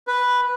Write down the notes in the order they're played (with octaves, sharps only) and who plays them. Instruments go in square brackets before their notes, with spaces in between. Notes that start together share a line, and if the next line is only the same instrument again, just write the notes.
[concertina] B4